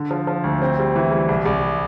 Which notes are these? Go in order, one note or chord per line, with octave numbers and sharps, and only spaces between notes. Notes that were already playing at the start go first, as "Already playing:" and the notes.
Already playing: D3
F3
F3
D2
C4
G3
E3
G3
C2
C2